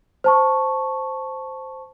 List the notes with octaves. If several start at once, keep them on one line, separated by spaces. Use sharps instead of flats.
C5 A5 C#6